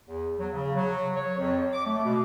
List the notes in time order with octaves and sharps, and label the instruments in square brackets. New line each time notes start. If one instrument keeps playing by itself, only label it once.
[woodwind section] E2
F#3
C#3
F#3
C#5
F2
D6
A3
B2